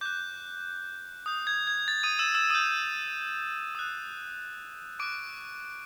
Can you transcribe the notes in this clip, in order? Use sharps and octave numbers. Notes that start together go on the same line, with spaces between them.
D6 F#6 G6
D#6 G6
G#6
G#6
A6
D#6 D#7
E6 E7
E6 E7
D#6 G6 D#7
D#6 F#6
C#6 D6 F#6 D7